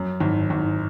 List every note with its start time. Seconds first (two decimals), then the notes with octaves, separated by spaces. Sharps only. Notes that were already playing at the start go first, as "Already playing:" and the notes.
Already playing: F#2
0.20 G#1
0.50 G#1